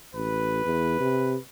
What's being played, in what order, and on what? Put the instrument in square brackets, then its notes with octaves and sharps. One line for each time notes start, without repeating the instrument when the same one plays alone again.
[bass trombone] A1 [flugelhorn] B4
[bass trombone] E2
C3